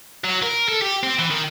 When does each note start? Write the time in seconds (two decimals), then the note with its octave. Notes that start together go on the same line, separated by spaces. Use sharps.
0.24 F#3
0.43 A#4
0.68 A4
0.82 G4
1.03 C4
1.19 E3
1.31 D#3